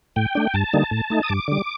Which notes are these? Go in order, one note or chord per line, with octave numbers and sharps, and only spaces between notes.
A2 G5
A3 D4
G2 A5
D3 G3 A#3 D#4
A2
A3 D#4
D#6
G2 D6
D3 G3